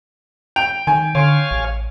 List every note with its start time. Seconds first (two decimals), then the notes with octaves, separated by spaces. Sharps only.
0.56 G5 F7
0.87 D#3 G#5
1.15 D3 C#5 F5 G#5 C6 C#6 D7
1.51 A1